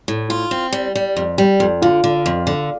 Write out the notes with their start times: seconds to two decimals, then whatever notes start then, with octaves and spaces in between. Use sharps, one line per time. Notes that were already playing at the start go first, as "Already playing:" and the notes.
0.08 A2
0.30 F4
0.51 C4
0.73 G3
0.96 G3
1.17 F2
1.38 G3
1.60 F2
1.82 D3 F4
2.04 D3
2.26 F2
2.47 D3